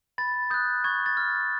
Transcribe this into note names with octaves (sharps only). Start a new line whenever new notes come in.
B5 A6
D#6 F#6 G6
C#6 G#6
A6
F6